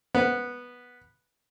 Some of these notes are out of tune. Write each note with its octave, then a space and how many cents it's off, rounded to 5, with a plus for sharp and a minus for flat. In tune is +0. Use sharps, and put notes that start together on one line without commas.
B3 -5